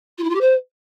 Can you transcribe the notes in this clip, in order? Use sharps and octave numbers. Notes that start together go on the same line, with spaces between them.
F4
E4
F4
G4
C5